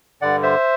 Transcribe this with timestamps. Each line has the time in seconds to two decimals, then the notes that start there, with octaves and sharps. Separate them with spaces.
0.22 G2 D3 D5 F#5
0.43 C5 E5